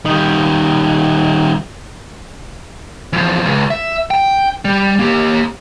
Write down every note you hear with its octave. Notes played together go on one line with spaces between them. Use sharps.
D#3 G3
E2 F3
C#2
E5
G5
G3
A#3 G4